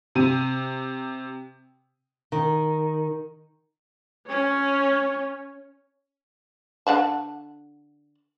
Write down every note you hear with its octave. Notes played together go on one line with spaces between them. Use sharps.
C3 D#7
D#3
C#4 C#5
D3 F#5 A5